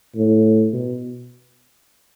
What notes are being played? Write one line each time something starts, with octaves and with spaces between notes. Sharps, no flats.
A2
B2